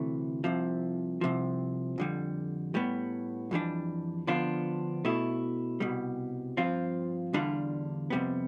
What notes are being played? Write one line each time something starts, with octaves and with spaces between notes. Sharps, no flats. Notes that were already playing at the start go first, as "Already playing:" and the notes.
Already playing: D2 C3 E3 A3
C2 C3 F3
C2 C3 F3
F2 D3 G3
A2 G3 B3
F2 E3 G3 D4
D3 F3 B3 D4 F4
B2 A3 E4
C2 B2 G3
G2 F3 C4 F4
E2 D3 G3 D4 F4
F2 C3 G3 B3